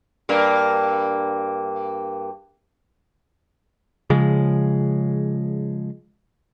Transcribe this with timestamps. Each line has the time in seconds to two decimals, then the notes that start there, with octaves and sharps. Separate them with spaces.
0.29 G2 A#3
4.10 C#3 F3 G#3